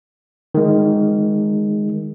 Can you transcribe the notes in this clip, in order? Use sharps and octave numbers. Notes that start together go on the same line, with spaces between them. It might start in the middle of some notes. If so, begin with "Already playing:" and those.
D#3 G#3